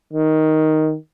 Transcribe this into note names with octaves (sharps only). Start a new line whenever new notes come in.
D#3